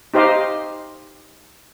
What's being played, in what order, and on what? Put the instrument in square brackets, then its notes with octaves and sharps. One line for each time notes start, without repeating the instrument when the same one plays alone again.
[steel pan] D#4 G4 C5 D#5 F5